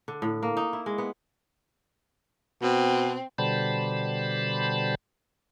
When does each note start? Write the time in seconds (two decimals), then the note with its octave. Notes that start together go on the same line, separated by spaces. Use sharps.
0.08 D3
0.22 A2
0.43 A#3
0.57 D#4
0.73 E4
0.86 G#3
0.98 B3
2.62 B2 C4
3.38 B2 D3 G3 C5 A5 B5